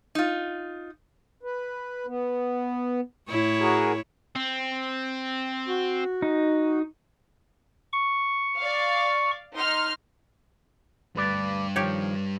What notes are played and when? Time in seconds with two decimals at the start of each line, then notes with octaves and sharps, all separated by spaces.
0.15 D#4 F4
1.43 B4
2.07 B3
3.28 A2 E4 C#5
3.59 F#4 G#4 A#4
4.36 C4
5.68 F#4
6.22 D#4
7.93 C#6
8.59 D5 F5
9.55 D#4 C6 F6
11.16 D2 G2 B4 D5
11.76 D#3 F3 G4 C#5